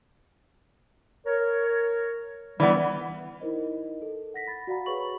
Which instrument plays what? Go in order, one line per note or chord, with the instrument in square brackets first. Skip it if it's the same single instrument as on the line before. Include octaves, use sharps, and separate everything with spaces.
[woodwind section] A#4 C#5
[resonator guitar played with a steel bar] E3 B3 [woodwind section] G3
[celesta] D#4 E4 A#4 C5 D#5
A4
F#5 A#6 B6
B5 A6
F#4 D5 F5 F#5 A#5 B5
G#4 B4 C#5 B5 C#6 F#7